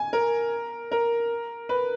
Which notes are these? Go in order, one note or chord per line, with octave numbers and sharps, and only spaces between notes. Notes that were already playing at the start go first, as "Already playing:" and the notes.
Already playing: G#5
A#4
A#4
B4